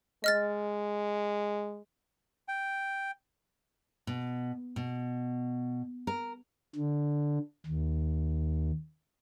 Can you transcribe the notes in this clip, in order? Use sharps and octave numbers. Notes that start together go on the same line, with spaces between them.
G#3 D#5 F6 A6
G5
B2
B2
A#4
D3
D#2